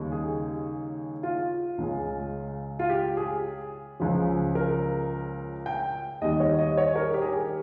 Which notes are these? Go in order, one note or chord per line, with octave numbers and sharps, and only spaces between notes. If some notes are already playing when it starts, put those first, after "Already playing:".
Already playing: D#2 C#3 G3 A#3 D#4
G#4
F4
C#2 C#3 G#3
F4
G4
G#4
C#2 C#3 F3
A#4
G5
D#2 D#3 G3 D#5
C#5
D#5
C#5
A#4
G4
G#4
G4